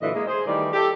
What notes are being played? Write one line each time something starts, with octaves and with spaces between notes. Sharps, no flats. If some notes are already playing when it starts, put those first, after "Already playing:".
A#2 D3 E3 F#3 D#5 E5
G#3 A#3
G#4 C5
D#3 E3 G3 A3 A#4 D5
G4 A4